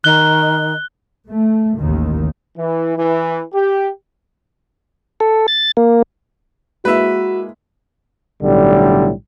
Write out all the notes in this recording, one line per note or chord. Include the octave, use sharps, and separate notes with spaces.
D#3 F#6 G7
A3
A1 D#2 D#3
E3
E3
G4
A4
A6
A#3
G#3 A#3 E4 F#4 B4 E5
B1 A2 D3 G3